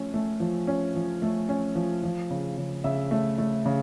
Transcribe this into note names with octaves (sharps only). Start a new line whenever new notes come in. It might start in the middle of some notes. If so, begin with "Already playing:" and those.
Already playing: F3 A3 C#4
A3
F3
C#4
F3
A3
C#4
F3
F3
C#3
C#3
C#3 E5
A3
A3
C#3